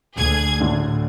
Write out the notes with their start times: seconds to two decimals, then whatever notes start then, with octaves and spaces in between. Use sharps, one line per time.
0.16 D2 G#4 G#6
0.60 D2 A2 D3